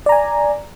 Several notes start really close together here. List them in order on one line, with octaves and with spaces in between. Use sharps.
D5 A#5 G#5